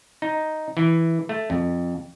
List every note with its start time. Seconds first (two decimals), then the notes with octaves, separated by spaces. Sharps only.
0.22 D#4
0.77 E3
1.29 A3
1.50 F2